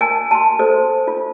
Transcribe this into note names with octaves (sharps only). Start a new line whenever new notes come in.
A#4 G#5 A5
A5 C6
A4 C5
F4